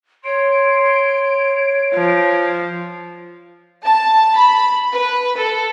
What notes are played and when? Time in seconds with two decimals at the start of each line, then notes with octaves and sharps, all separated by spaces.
0.25 C#5 C6 D7
1.94 F3
3.85 A5
4.37 B5
4.93 B4
5.37 A4